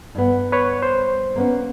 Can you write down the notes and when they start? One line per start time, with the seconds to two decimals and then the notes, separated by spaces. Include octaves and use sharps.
0.15 G2 B3
0.52 B4 C#5
0.83 C5
1.36 A#3 B3 C#4